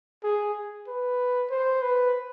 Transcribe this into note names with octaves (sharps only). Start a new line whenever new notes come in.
G#4
B4
C5
B4